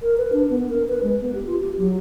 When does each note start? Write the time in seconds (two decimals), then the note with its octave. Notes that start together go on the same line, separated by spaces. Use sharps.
0.02 A#4
0.17 B4
0.33 D4
0.50 B3
0.69 A#4
0.89 B4
1.03 G#3
1.21 B3
1.34 G4
1.47 F4
1.60 G4
1.78 F#3